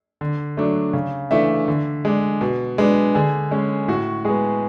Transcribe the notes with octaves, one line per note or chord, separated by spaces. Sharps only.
D3
F#3 A3 D4
C#3
E3 A3 D4 E5
D3
G#3 D4
B2
G#3 B3 D4
D3 G#4
G#3 C#4
A2 F#4
G#3 B3 G#4